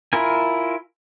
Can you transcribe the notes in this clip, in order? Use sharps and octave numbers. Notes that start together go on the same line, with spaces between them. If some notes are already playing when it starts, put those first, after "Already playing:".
E4 F4 A#4 G#5